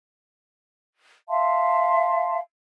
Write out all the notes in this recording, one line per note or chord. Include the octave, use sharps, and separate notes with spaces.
E5 F5 A5 C6